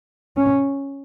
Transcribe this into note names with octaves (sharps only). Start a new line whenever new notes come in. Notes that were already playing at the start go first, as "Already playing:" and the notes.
C#4